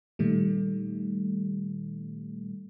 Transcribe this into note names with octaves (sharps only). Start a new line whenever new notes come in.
A#2 D#3 G3 A3